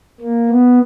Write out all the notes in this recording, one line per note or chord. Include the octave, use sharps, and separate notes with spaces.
A#3
B3